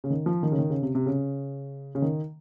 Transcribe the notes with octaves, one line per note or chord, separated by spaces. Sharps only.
C#3
D#3
F3
D#3
C#3
D#3
C#3
C3
C3
C#3
C#3
D#3